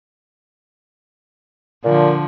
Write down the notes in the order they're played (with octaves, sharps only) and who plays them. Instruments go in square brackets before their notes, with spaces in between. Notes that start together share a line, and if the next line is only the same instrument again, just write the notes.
[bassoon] A#2 [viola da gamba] D3 F3